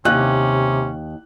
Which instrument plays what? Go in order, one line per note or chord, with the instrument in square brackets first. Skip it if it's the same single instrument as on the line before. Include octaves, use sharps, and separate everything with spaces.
[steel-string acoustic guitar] D#2 [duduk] C3 [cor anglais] C#4 [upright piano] F#6